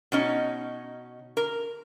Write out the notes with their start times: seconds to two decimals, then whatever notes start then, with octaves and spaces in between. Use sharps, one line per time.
0.12 B2 C#4 D#4
1.37 A#4